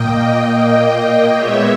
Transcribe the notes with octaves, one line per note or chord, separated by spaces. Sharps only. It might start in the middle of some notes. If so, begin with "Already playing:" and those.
Already playing: A#2 A#3 D#5 G5
D#5 G5
A#2 G#3 B3 C#5 E5